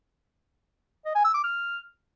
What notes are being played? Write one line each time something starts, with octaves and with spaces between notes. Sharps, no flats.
D#5
G#5
E6
D6
F6